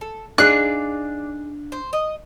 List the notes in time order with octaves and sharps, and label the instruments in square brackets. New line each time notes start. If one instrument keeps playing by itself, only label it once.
[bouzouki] A4
[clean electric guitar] D4 F5 [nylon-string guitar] D#4 G#4 [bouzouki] D5 [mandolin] F#6
[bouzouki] C5
D#5